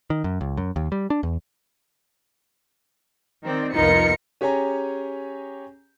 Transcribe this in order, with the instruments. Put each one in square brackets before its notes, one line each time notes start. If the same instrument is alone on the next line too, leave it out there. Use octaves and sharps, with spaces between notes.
[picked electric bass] D#3
F#2
C#2
F#2
D#2
G3
D4
E2
[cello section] D#3 C4 D5
[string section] C2 F2 C#7 [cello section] B3 F4 A#4 [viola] D#4
[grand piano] C#4 G4 G#4 C#5 G#5 A#5